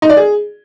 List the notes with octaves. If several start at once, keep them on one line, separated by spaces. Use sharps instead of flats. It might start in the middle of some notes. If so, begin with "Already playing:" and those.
D#4
D5
G#4